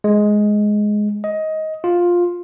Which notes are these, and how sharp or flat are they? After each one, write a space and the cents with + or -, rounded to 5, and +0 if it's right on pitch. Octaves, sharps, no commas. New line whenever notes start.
G#3 +10
D#5 +15
F4 +10